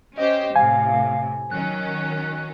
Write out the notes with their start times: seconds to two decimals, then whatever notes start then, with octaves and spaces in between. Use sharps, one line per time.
0.18 C#4 G4 C5 D#5
0.56 A2 C3 F5 G#5
1.51 D#3 F#3 C#4 F#6